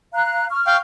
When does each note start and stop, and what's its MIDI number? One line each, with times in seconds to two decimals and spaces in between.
0.14 0.46 77
0.14 0.46 82
0.14 0.46 90
0.50 0.79 85
0.50 0.79 89
0.67 0.77 77
0.67 0.77 79